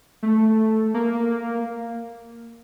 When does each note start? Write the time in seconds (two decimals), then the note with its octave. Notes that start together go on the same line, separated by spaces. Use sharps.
0.23 A3
0.94 A#3